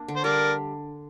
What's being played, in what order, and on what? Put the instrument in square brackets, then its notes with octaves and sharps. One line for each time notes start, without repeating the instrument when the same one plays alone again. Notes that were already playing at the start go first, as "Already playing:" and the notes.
Already playing: [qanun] A#3 D4
D3
[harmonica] C5
[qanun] G3 [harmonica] A#4 D5